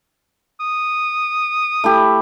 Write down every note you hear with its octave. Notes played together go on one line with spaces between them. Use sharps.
D#6
A3 E4 G4